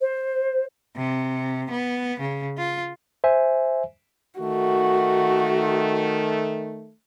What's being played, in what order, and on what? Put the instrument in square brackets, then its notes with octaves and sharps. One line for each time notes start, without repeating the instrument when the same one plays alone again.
[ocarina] C5
[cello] C3
B3
C#3
F4
[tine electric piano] C5 E5 G#5
[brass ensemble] D#3 A3 [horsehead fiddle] F#4